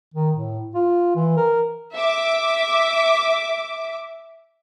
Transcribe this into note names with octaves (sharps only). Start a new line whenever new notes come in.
D#3
A2
F4
E3
A#4
E5 D6